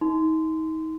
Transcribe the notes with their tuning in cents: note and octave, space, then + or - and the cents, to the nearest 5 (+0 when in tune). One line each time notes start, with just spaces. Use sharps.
D#4 +35 C6 -20